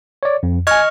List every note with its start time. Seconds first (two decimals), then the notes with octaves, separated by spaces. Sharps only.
0.23 C#5 D5
0.43 F2
0.67 D#5 G#5 C#6 F6 G#6